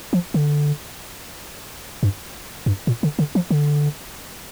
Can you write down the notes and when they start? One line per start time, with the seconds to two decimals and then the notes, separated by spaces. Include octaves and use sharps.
0.13 F3
0.34 D3
2.03 G2
2.66 G2
2.87 A#2
3.03 D3
3.19 D3
3.35 F3
3.51 D3